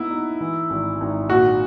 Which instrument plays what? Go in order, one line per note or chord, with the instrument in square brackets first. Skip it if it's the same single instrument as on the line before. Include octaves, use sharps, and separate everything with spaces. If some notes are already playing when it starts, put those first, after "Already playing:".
Already playing: [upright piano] B3 D#4 [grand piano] E4
[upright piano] D#4
E3
G#1
G#1
[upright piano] A#2 [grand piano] F#4